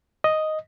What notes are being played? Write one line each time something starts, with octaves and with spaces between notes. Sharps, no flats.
D#5